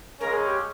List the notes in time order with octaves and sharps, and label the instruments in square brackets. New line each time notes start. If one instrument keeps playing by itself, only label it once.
[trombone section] C#3 G#3 C#4 [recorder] A#4
[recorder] G#4
G4